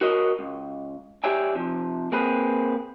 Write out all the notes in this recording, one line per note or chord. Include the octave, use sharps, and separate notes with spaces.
F#4 A#4 C#5 D#5
C#2
G4 C#5 D5 E5 G5 G#5
C3 F3
A#3 C4 G#4 B4